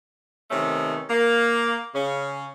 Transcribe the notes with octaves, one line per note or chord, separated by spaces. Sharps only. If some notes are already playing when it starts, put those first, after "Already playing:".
C3 D#3 A3 B3 C#4
A#3
C#3 C#4